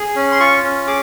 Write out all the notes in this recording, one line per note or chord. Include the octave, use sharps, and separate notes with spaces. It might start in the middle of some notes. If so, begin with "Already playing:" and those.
Already playing: G#4
C#4
C6
F4 C#6
C#4
G#4 D6